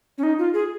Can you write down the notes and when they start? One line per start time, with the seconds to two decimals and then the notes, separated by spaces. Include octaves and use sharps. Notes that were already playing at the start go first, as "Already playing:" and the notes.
0.18 C#4
0.23 D#4
0.39 F4
0.54 G#4